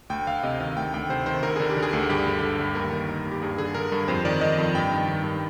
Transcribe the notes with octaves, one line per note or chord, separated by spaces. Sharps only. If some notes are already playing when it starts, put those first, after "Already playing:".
D2 G5
D2 F5
C3 D#5
D#3 F5
D2 G5
D2 G5
C3 C5
D#3 C5
D2 A#4
D3 G#4
G4
D3
G#4
D2
G2 G4
D3
D3
G2
D#2 A#4
D#3
D#3
D#2
G4
G2 G#4
D3 G#4
D3 A#4
G2
F2 C5
D#3 D5
D#3 D#5
F2
G2 G5
D#3
D#3
G2